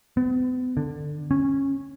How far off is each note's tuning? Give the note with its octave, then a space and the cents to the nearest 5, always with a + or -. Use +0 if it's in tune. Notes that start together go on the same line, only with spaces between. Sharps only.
B3 +45
D3 +15
C#4 -15